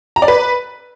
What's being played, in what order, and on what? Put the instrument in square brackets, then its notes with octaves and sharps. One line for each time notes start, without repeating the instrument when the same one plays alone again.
[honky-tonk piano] A#5
D5
B4